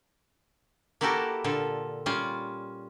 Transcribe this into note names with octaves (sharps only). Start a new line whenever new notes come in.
A#3 E4 F#4 G4 A4 A#4
A#2 D3 F4 A4
G3 C#4 F4